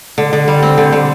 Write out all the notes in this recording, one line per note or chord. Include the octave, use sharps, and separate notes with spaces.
D3
D3
G3
C4
D3
D3